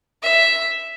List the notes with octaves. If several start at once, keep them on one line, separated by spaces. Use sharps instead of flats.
E5